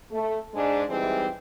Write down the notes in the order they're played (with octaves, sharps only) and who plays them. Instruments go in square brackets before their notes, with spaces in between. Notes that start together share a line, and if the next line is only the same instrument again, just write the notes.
[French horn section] A3
G#2 G#3 D4
E3 G3 G#3 C4 D#4 E4